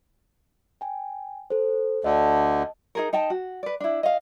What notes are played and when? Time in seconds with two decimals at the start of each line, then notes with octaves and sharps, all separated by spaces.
0.81 G5 G#5
1.50 A4 C5
2.04 D2 D3 D#5 A5
2.95 D#4 G#4 A#4
3.13 D#4 D#5 G5 A5
3.30 F#4
3.63 B4 D5
3.80 D4 E4
4.03 D#5 F5